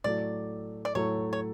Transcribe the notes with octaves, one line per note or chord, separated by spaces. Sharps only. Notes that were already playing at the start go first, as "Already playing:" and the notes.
A2 F#3 A3 D5
D5
A2 F#3 A3 C#5
C#5